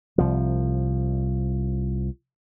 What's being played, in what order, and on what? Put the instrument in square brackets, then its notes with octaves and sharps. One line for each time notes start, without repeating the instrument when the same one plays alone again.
[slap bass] C2 F3